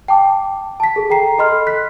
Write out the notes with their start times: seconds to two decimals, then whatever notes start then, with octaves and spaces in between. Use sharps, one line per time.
0.08 G5 A5 D6
0.80 A5 B6
0.96 G#4 A4
1.10 A4 G5 A#5 C7
1.39 A4 D#5 B5 C6 F6
1.67 F#6 B6